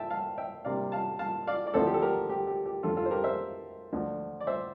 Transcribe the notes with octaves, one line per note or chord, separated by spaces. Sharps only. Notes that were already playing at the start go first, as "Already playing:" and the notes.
Already playing: E5 G5 A5
F5 A5
E5 G5
C3 G3 A#3 D4 D5 F5
F5 A5
F5 A5
D5 F5
D5
D2 D3 F3 C4 E4 A4 C5
G4
A4
G4 A#4
G4
G4
G4
F2 D3 A3 F4 A4
F4 A4
C5
G4 A#4
C5 E5
D2 D3 F3
D5
C5 E5